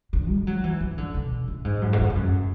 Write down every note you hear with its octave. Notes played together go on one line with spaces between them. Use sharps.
D3
G#3
F#3
E3
E3
D3
B2
A2
G#2
F#2
G#2
F#2
G#2
F#2